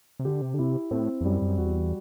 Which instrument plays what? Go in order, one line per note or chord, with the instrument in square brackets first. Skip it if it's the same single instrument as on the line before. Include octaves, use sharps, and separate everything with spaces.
[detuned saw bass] C3
[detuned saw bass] D3 [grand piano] G4
[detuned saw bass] C3
D3
[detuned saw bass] C3 [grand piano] E4
[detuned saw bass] A2 [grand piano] C4
[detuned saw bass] E2
[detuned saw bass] F#2 [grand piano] G3
[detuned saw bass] F#2
[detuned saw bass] E2 [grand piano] F#4